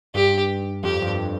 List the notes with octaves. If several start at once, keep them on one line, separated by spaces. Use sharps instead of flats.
G2 G4
F2 G4
G2
F2
G2